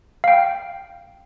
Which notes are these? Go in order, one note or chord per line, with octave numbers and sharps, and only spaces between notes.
F5 G5